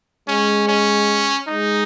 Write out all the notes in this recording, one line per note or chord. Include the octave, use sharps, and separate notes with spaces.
G#3 C#4
C#4
G#3 D#4